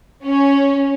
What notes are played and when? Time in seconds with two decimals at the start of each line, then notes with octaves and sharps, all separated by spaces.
0.23 C#4